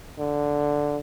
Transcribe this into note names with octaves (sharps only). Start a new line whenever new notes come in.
D3